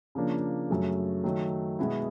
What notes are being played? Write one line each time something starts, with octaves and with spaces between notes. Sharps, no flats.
C#3 F3 A#3 D4
F#2 C#3 F#3 A3
D#3 F#3 A3
B2 G#3 B3 E4